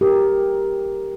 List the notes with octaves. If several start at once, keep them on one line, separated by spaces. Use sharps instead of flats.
G4 A#4